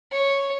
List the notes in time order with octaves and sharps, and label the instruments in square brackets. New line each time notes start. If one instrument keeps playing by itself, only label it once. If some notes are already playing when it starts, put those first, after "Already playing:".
[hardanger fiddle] C#5